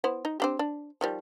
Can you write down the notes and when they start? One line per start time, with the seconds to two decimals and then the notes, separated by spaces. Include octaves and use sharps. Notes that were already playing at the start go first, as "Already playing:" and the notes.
0.04 B3 E4 C5
0.25 D#4
0.40 C4 D4 G4
0.59 D4
1.01 D#3 F3 G3